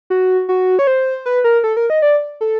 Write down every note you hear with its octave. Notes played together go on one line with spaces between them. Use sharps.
F#4
F#4
C#5
C5
B4
A#4
A4
A#4
D#5
D5
A4